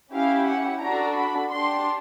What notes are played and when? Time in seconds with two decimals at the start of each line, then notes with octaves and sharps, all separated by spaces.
0.13 C#4 E4 G4 F5
0.48 F#5
0.83 D4 F#4 A4 A#5
1.17 B5
1.51 D4 G4 C6